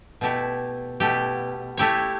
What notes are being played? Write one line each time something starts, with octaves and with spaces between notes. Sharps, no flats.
B2 A3 E4 G4
B2 A3 E4 G4
A3 E4 G4 C#5